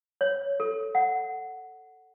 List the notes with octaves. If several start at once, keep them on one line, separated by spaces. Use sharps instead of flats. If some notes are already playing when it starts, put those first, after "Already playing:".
C#5
A4
F#5